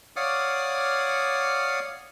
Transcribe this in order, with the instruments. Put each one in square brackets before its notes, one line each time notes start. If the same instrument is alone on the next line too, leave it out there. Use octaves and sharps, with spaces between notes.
[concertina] C#5 D5 F5 F#5 D6 D#6